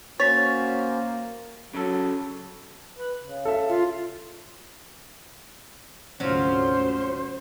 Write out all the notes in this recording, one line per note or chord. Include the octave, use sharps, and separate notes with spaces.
A#3 C#4 F#4 C5 C#5 A6 B6
C#3 F#3 A4
B4
C#3
A4 E5
F4
D2 G#2 C3 F#3 C#4 F4 C5